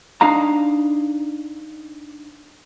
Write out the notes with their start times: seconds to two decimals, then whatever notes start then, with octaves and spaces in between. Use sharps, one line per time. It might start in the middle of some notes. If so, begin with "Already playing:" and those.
0.21 D4 D#4 F5 A#5